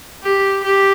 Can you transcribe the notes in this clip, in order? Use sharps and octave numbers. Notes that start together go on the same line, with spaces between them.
G4
G4